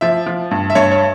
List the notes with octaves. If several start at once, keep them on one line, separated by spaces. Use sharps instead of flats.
F3 E5
F3
G2
E5
G2 C#5
C#5